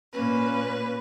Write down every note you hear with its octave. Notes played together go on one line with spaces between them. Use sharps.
A#2 A#3 C#4 B4